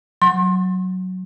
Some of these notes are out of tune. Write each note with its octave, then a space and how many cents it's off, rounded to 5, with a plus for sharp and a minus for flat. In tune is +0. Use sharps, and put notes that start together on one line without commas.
F#3 +0 C6 +35